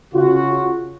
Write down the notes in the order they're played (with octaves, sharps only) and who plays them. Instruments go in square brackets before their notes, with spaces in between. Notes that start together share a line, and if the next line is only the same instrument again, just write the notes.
[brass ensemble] C#3 F4 F#4